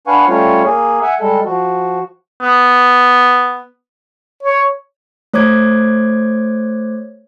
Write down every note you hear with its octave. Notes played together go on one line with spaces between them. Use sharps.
D4 B4 F5 F#5 G#5 C#6
G3 A3 C#4 F4 C#5
A#3 G#4
E5 F#5 G#5
G3 G#3 A4
F3 F#4
B3
C#5
A3 C5 C#5 D6 G#6